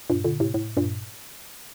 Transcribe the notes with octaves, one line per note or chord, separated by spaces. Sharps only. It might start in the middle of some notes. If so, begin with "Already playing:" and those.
G2 A#2
A#2 D3
A2 C3
A2
G2 A#2